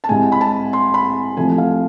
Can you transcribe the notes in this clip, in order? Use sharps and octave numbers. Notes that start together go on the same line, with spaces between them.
A5
C2 C3 G#3 G#5
B5
A5
C6
B5
C2 C3 F3 A3 G#5
F5